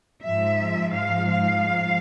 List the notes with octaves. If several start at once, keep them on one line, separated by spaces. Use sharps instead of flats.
G#2 F3 E5
F5
F5